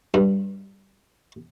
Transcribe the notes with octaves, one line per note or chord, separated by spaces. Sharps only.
G2